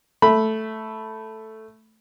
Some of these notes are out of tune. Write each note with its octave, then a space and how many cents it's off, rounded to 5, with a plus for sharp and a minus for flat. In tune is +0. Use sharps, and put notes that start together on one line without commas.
A3 +0 B5 +0